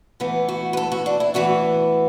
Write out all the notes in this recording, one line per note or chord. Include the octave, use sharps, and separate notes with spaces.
A2 E3 B3
F#4
B4
A4
F#4
D4
E4
A2 E3 B3 F#4